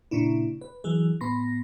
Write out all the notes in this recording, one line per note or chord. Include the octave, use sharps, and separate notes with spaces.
A#2 C#3 D4 E4
B4
E3 F#3 G#4
A2 B3 B5 C6 A#6